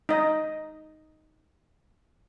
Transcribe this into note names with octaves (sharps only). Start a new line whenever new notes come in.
D#4 D#5